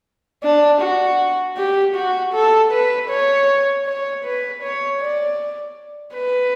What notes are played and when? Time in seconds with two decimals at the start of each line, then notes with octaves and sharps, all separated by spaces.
0.43 D4
0.81 F#4
1.57 G4
1.95 F#4
2.34 A4
2.72 B4
3.10 C#5
3.86 C#5
4.25 B4
4.63 C#5
5.01 D5
6.15 B4